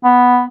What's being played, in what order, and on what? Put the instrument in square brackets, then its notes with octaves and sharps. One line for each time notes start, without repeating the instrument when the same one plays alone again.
[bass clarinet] B3